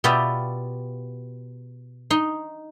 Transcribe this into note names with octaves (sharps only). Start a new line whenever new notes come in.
B2 B3 F4 G4 D5 E5
D#4 C6